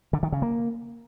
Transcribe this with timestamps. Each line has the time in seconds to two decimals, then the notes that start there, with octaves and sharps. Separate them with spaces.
0.13 D3
0.23 D#3
0.32 C#3
0.42 A#3